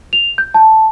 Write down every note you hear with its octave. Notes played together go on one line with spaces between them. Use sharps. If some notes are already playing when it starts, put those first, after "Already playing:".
F7
G6
A5